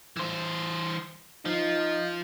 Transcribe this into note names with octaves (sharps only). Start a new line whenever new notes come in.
E3 C5
F3 D#4